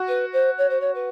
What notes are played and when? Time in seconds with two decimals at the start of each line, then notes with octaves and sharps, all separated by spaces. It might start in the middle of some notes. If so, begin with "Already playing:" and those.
Already playing: F#4
0.08 B4
0.33 C5
0.58 C#5
0.70 C5
0.81 C#5
0.95 B4